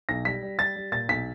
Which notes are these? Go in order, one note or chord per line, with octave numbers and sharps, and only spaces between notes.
B1 A#6
G3 B6
G3
G3 A6
G3
A#2 A6
B1 B6